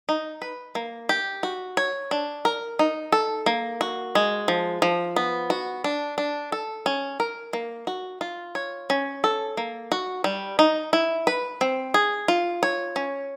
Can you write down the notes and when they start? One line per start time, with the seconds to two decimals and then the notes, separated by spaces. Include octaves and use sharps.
0.09 D#4
0.42 B4
0.75 A#3
1.09 G4
1.43 F#4
1.77 C#5
2.11 D4
2.45 A#4
2.79 D#4
3.12 A4
3.46 A#3
3.81 F#4
4.15 G#3
4.48 F3
4.82 F3
5.16 B3
5.50 F#4
5.84 D4
6.18 D4
6.52 A4
6.86 C#4
7.20 A#4
7.53 A#3
7.87 F#4
8.21 F4
8.55 C#5
8.90 C#4
9.24 A4
9.57 A#3
9.92 F#4
10.24 G3
10.59 D#4
10.93 E4
11.27 B4
11.61 C4
11.94 G#4
12.28 F4
12.63 C#5
12.96 C#4